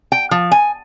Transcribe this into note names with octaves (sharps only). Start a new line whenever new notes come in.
G5
F3
G#5